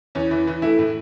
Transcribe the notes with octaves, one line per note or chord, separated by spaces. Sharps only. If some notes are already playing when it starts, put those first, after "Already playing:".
E2 C#4
E3
E3
A3 E4
A2